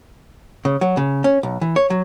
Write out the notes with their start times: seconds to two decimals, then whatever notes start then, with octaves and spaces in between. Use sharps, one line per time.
0.65 C#3
0.81 F#3
0.97 C#3
1.24 C#4
1.43 B1
1.61 E3
1.76 C#5
1.90 F#3